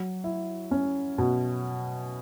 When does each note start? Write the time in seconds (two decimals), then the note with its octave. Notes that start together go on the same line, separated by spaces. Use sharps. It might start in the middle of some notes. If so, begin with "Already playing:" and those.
Already playing: F#3
0.24 E4
0.71 C#4
1.18 B2